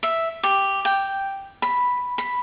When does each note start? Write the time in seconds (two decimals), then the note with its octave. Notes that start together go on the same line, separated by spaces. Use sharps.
0.03 E5
0.43 G4
0.85 G5
1.62 B5
2.18 B5